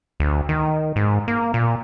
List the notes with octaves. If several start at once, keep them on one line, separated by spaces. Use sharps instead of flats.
D2
D#3
G#2
A#3
A#2